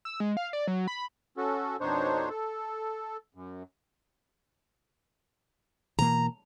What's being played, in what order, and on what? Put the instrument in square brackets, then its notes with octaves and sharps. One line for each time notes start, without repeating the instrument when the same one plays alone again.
[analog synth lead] E6
G#3
F5
D5
F#3
B5
[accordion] C#4 F#4 A4
F2 B2 D4 D#4 C5 C#5
A4
F#2
[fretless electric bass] B2 E3 A#3 [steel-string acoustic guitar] A#5